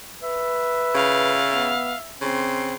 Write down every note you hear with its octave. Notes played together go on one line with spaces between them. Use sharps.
B4 E5
C#3 F5
B3
C#3 C4 C6